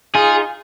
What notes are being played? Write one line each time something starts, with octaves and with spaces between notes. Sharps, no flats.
D#4 F4 G#4